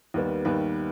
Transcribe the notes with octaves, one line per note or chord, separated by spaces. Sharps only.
D#2 D#3 G3 B3
D#2 D#3 G3 B3 B4